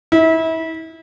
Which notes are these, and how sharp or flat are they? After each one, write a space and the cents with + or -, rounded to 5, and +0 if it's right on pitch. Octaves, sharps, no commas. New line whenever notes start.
E4 -30